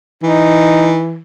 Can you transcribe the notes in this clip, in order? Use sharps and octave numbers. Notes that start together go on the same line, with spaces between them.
E3 D#4